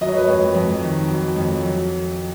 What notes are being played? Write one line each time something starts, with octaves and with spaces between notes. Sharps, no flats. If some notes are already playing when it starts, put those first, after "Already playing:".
F#3 D#5
C#5
B4
F2 C#5
F2
D#3
F#3
F2
F#3